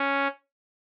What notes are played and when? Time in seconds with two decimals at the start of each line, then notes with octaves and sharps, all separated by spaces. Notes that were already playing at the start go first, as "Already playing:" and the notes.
Already playing: C#4